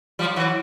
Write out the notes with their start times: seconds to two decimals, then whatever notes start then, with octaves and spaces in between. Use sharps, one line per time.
0.19 F3 G3
0.36 E3 F#3